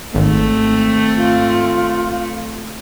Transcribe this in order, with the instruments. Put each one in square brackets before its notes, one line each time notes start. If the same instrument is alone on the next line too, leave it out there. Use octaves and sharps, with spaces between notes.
[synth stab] G#1 [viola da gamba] A3 C4
[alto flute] F4